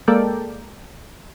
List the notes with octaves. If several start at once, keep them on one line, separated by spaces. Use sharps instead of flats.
G#3 A#3 A4 A#4 D5 G5